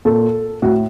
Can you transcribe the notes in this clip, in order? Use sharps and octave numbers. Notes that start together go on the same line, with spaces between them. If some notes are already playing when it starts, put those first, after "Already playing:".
A#2 A4
A2 F#4